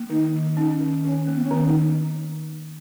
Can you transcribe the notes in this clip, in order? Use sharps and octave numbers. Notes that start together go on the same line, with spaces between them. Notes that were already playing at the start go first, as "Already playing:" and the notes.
Already playing: A#3
D#3 D#4
D#3
C#4 D#4
D#3
D#3 C#4
A#3
B3
C#4
D#3 B3
D#4